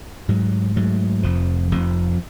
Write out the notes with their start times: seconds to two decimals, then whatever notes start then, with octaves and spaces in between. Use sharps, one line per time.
0.28 G#2 F#3 A3
0.76 G#2 F#3 A3
1.23 F1 F2 F3
1.71 F1 F2 F3